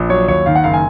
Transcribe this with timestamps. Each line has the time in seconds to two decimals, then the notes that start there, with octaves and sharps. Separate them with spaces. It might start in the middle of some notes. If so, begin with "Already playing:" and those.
Already playing: A#1
0.09 F#3 C#5
0.28 D#2 C#5
0.46 D#3 F5
0.55 F#5
0.64 F#1 F5
0.74 G#5